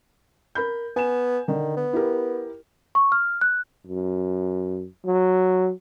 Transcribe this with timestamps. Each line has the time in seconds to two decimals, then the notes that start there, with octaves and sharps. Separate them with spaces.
0.55 A#4 B5 G6
0.96 B3 G#5 E7
1.48 D3 D#3
1.76 B3
1.93 E4 G4 A#4
2.95 C#6
3.12 F6
3.41 F#6
3.87 F#2
5.05 F#3